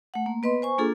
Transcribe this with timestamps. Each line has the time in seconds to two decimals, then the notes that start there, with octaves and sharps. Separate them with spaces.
0.14 A3 F#5
0.26 A#3
0.43 B3 B4 D#5 C6
0.62 C5 G#5 C#6
0.78 A#3 D4 F4 G#4 A4